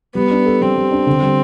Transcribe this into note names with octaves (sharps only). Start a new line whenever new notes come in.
G3 B3
D4
A4
G3 C4
G3
D4
D3
G3